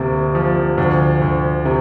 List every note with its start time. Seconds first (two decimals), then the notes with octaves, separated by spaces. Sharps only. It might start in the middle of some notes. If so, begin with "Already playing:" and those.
Already playing: D2 C3 A#3
0.35 F3
0.78 D2
1.22 D2
1.65 C3